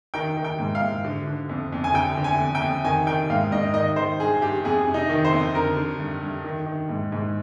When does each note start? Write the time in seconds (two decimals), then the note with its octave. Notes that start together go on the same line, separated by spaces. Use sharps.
0.14 D#3 G5
0.37 D#3
0.44 G5
0.59 G#2
0.75 F5
0.82 G#2
1.05 D3
1.27 D3
1.49 F2
1.72 F2
1.84 G#5
1.94 D3 G5
2.17 D3
2.24 G#5
2.39 F2
2.55 G5
2.61 F2
2.84 D#3 G#5
3.06 D#3 G5
3.30 G#2 F5
3.52 G#2 D#5
3.74 D#3 D#5
3.96 D#3 C5
4.19 G2 G#4
4.41 G2 G4
4.64 F2 G#4
4.87 C3
4.94 D#4
5.09 D#3
5.25 C5
5.33 F2
5.55 D3 A#4
5.77 D3
5.99 G2
6.21 G2
6.44 D#3
6.66 D#3
6.89 G#2
7.12 G#2